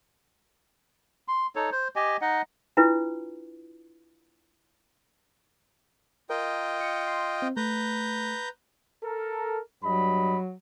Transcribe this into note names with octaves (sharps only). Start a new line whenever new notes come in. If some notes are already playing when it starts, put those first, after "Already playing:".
C6
D#4 A4 C#5
C5
G4 D#5 G#5
D#4 D#5 F#5
D4 E4 F4 B4
F4 A#4 D#5 G5
C#7
C6
C4
A3 B4 A#5 G6
A4 A#4
G2 F#3 D#5 B5